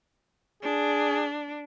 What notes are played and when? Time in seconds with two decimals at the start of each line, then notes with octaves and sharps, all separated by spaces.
0.63 D4 G#4